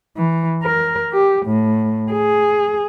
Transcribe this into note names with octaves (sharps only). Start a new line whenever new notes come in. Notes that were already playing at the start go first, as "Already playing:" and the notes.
E3
A#4
G4
A2
G#4